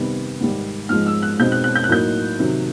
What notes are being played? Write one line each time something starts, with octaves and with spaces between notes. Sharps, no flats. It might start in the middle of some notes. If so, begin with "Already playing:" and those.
Already playing: C3 D#3 G3 B3
G#2 D#3 G3
G#2 F3 G#3 F6
E6
F#6
B2 G#3 C4 D#4 G6
F#6
F#6
G6
F#6
A2 F#3 A#3 D#4 G6
C3 D#3 F#3